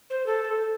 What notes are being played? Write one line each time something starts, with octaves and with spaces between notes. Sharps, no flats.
C5
A4